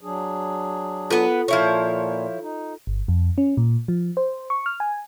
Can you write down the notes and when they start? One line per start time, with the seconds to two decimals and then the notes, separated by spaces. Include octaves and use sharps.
0.01 F#3 D4 G#4
1.10 B3 F4 A4 B4
1.48 A#2 F3 E4 C#5
2.42 D#4
2.87 G1
3.08 F2
3.38 C#4
3.57 A#2
3.88 F3
4.17 C5
4.50 C#6
4.66 F6
4.80 G#5